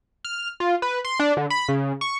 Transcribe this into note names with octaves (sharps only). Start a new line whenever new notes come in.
F6
F4
B4
C6
D4
D3
B5
C#3
C#6